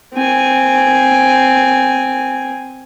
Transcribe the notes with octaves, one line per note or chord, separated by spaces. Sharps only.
C4 G#5